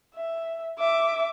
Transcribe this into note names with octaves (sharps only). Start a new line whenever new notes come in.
E5
E5 D6